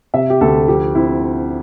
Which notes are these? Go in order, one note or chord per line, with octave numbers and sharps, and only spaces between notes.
C3 E5
G4
D2 A4
F3 G4
C4 E4